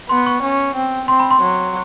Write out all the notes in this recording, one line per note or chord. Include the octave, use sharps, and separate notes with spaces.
B3 C6
C#6
C#4
C4
C4 C6
B5
C6
F#3